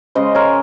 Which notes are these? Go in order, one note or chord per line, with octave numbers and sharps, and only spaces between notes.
C#3 G#3 C5 D#5
A#4 C#5